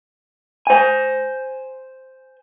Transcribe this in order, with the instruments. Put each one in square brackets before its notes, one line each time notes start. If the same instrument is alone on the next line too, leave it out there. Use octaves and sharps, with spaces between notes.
[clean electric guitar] C5 G#5